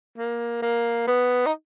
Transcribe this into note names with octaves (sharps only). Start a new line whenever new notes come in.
A#3
A#3
B3
D#4